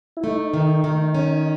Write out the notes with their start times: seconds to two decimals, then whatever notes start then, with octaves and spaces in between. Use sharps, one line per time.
0.17 E4
0.24 A3 D#4
0.54 D#3
0.84 D#3
1.14 C#4